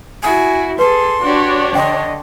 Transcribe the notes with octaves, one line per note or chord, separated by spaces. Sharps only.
E4 F#4 G#5
G#4 A4 B4 C6
D4 F#4 G4 C#5
D3 D#5 G5 C6